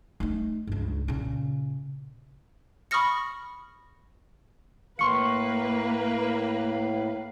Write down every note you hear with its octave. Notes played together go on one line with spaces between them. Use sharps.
A3 D#4
C#2 G2
A#2 C#3
B5 C#6 D#6 F6 A#6 C#7
A2 A#3 B4 F5 C6 C#6 C#7